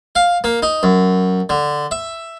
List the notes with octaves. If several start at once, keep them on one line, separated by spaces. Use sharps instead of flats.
F5
A#3
D#4
F#2
D3
E5